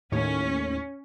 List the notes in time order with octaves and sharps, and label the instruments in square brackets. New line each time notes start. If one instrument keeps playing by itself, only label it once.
[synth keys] D#2 A2 C#5 [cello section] C#4